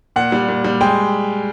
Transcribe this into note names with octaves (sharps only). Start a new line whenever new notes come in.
A#2 F#5
G3
A#2
G3
G#3 G5